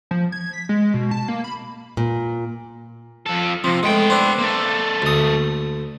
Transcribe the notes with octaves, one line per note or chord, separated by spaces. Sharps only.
F3
G#6
B6
G#3
B2
A5
A#3
B5
A#2
F2 A4
C3 F3
G#3 A3 B3 G5
C4 D4 B4
A#3 A4
D2 D#6